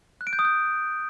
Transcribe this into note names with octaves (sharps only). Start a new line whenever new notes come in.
F#6
D7
G6
D#6
G6